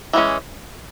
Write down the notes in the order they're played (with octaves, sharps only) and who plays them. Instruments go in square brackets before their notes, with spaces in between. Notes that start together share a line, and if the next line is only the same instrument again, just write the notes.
[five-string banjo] E3 G#3 C#4